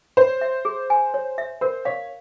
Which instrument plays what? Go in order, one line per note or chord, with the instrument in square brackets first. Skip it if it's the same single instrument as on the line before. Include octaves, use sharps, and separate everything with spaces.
[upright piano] C5 [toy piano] C#5
[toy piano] E5
G#4
G#5
C#5
E5
[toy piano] A#4 [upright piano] C5
[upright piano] C#5 [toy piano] F5